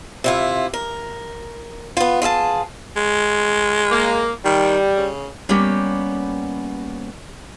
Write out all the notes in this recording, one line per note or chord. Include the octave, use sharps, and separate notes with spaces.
C3 E4 F4
A#4
B3 F4
F4 G#4 E5 A5
G#3
A#3
D#3 G3
C#3
G3 A#3 B3 C#4 G4